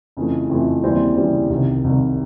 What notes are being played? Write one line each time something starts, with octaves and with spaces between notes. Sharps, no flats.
F2 C#3 E3 A3
F2 C#3 E3 A3
D#2 C#3 E3 G3 C4
D#2 C#3 E3 G3 C4
C2 C3 D#3
C2 C3 D#3